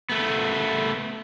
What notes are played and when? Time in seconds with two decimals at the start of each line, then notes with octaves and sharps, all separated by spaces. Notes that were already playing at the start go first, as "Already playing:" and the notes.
0.10 A3 B3